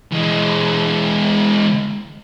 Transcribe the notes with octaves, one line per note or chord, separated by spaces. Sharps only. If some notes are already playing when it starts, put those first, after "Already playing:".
E3 G#3